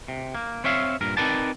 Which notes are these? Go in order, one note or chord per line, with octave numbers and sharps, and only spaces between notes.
C3
A#3
C4 C#5 E5 F5
G2 A#2 A#4
C4 D#4 A#4 B4 D5 A5